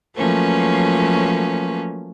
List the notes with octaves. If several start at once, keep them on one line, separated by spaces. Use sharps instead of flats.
F3 F#3 A3 A#3 C#4 B4